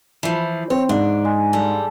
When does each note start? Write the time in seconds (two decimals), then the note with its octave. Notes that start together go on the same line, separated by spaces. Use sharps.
0.23 E3 F3 B5
0.70 C4 C#5
0.89 G#2 D4
1.25 G#3
1.53 G3 A4